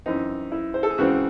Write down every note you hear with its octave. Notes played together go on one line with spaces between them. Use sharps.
F#2 E3 C4 D#4
E4
C5
A4
G#4
C#2 C#3 E3 C4 F#4